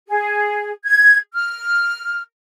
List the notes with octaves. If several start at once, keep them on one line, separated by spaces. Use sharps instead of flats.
G#4
G#6
F6